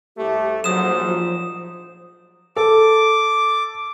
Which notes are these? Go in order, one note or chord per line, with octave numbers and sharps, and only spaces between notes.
C2 A3 G4
A#1 G#2 F#3 C5 D#6 E7
F3
A4 D6